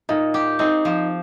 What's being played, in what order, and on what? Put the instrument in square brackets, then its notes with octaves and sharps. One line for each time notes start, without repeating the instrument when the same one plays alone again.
[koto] A#2 [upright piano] D#4
[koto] G4
[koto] C4 [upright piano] D#4
[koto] F3